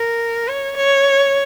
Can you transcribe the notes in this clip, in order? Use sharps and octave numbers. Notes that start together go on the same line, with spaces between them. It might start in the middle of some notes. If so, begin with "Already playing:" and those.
Already playing: A#4
C#5
C#5